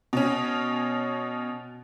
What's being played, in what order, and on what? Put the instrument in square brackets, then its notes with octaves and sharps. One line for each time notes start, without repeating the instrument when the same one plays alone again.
[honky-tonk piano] B2 C#4